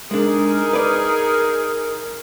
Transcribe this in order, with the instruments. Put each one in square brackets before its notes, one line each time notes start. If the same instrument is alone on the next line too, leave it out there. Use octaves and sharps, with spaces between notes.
[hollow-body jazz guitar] G#3 D4 [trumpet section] D#4 G#4 [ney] A#4
[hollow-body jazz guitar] B4 D5